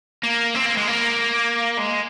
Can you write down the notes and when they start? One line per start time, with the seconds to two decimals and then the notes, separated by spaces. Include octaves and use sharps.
0.23 A#3
0.55 C4
0.66 A#3
0.77 G#3
0.88 A#3
1.78 G#3